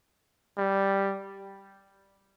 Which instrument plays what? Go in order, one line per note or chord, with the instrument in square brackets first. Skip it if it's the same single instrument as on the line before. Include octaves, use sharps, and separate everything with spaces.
[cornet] G3